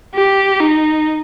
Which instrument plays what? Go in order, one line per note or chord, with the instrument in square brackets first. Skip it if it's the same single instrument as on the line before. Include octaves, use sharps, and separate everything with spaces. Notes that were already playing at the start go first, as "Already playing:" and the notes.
[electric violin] G4
D#4